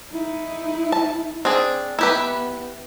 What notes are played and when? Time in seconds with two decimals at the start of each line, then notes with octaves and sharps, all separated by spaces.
0.12 D#4 E4
0.92 A5
1.45 C4 D4 G#4
1.99 B3 E4 G4 B4